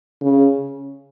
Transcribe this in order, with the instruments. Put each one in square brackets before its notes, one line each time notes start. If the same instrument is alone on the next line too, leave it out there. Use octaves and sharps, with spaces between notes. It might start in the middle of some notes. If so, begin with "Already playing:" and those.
[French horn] C#3